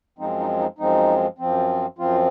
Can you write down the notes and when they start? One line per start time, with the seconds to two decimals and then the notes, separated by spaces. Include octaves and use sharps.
0.18 F#2 F3 G#3 C4 D#4
0.40 D#4
0.59 D#4
0.78 F#2 F3 G#3 C4 D#4
1.38 F#2 F3 C4
1.98 F#2 F3 C4 F4